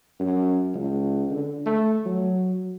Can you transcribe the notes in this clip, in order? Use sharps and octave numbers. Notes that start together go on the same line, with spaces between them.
F#2
C#2
D3
A3
F#3